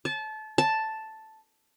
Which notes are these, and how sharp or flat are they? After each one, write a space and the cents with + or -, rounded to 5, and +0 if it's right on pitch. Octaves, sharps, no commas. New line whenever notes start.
A5 -25
A5 +0